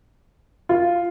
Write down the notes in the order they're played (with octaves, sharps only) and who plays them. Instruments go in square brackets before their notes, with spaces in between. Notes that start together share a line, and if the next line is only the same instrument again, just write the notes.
[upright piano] F4